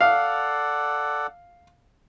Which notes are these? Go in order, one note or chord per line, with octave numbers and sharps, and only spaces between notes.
A4 D5 F5 F#5